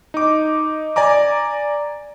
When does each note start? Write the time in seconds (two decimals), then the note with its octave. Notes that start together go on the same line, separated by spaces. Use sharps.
0.14 D#4 D6
0.96 D5 G#5 A#5 D6